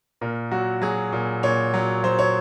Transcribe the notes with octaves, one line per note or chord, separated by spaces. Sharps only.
A#2 A#4
F#3 F#4
F#3 G#4
A#2
A#2 C#5
F#3
F#3 C5
C#5